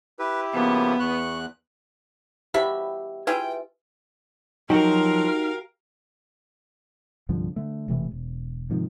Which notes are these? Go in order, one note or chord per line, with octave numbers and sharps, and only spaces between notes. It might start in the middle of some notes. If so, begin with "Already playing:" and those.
E4 G4 B4
C#3 F3 A#3 B3
E2 F#5 C#6 F#6
B2 E4 G4 C5 E5 F5 B5
E4 F4 G#4 B4 G5
F3 F#3 D#4 F#4 G4 A#4 F5
C2 G2 D3 F3
D3 A3
E1 C3 E3 A3
E1
G#2 C3 D#3 F3